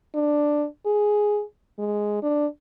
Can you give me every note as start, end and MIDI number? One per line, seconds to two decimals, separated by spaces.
0.15 0.67 62
0.86 1.43 68
1.79 2.21 56
2.23 2.46 62